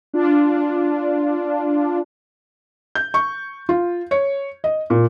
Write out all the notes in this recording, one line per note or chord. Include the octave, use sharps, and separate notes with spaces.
D4 F4
G6
C#6
F4
C#5
D#5
A#2